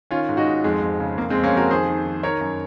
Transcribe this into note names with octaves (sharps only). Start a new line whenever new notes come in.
D#3 C#4 F4
G#2
D#4 F#4
G#2
F2 G#3
F2
C#3
F2 A#3
G#3 C4
F2
A#3 C#4
F2 F#4 A#4
D#3 G#4 C5
D#3
D#3
D#3 A#4 C#5
F#2